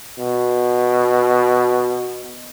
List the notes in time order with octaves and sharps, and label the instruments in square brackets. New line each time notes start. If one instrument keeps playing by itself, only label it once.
[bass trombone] B2